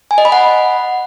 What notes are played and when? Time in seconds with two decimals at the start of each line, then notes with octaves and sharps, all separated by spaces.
0.11 G#5
0.18 D#5
0.25 B5
0.32 F#5